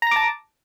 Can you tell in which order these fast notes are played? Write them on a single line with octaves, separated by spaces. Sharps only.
A#5 A#6 D6 A5